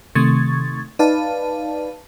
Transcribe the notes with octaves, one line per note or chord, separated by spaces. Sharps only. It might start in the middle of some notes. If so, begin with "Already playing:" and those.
C3 D#3 A3 C#6 G#6 A6
D#4 B4 D5 F5 A5